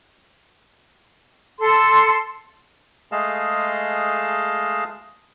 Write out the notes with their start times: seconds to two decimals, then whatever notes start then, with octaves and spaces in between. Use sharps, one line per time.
1.60 A4 C6
3.12 G#3 A3 G#4 D#5 F5 A5